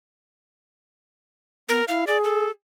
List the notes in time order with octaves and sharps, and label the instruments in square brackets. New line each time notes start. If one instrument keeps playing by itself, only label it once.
[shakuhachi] B3 [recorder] A#4
[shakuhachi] E4 [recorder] F5
[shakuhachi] G#4 [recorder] D5
[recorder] A4